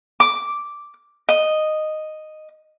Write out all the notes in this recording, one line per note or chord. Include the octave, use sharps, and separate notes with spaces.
D6
D#5